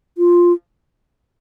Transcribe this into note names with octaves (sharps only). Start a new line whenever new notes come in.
F4